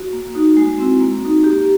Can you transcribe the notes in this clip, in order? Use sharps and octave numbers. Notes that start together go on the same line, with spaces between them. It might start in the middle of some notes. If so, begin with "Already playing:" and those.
Already playing: F#4
A#3
D#4 F#4
G#3 F#4
C4 E4
A#3
D#4 F#4
A#3 G4